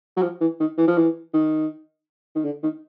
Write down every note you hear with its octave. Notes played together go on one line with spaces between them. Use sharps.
F#3
F3
E3
D#3
E3
F3
E3
D#3
D#3
D3
D#3